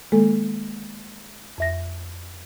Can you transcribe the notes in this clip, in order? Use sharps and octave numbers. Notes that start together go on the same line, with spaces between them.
D#3 G#3 A#3 A4
F2 E5 A#6